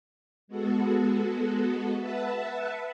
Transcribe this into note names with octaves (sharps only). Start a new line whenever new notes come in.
G#3 B3 F#4 A4
B4 E5 F#5 A5